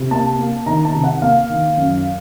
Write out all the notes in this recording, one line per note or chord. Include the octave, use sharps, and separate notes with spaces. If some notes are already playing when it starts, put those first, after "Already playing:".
Already playing: C3
A#3 A5
A#3
D#3 A#5
A5
C3
F#5
A#3 F5
D#3
F#2